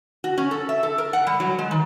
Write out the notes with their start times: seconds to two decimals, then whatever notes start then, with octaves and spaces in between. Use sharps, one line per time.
0.24 F#4
0.38 C#4
0.51 A4
0.69 E5
0.83 A4
0.98 A#4
1.13 F#5
1.27 G3
1.40 F#3
1.59 G#3
1.71 D#3